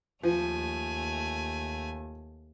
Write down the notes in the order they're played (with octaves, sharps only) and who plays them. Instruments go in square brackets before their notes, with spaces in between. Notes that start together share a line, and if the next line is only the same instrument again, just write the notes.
[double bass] D#2 [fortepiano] F3 [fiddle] A3 G#5